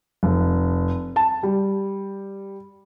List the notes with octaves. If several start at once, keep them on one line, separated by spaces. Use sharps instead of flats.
F1
A5
G3